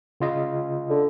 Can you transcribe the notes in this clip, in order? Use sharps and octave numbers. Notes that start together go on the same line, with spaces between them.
C#3 F4 D#5
D3